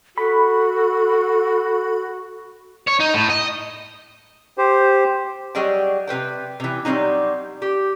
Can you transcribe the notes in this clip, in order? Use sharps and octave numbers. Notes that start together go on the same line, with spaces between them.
F#4 A4 B5
C#5
D#4
A2
D#5
G4 C5
F#3 G3 G#4 D#5 G5
C3 B4 C5 G5
C3 E3
F#3 G3 A#3 C4 D#4
G4